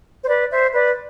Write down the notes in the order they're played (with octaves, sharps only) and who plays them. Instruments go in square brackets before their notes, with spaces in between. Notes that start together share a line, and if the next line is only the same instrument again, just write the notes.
[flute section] C5
B4 D5
C5 E5
B4 D5